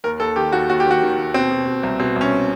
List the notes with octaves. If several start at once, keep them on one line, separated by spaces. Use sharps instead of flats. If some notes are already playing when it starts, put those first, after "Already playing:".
D#2 A#4
D#2 A4
D#3 G4
D#2 F#4
D#2 F#4
G4
D#3 F#4
D#3
D#2
B2 C4
B2
B2
C2
B2 C4
C2 C#4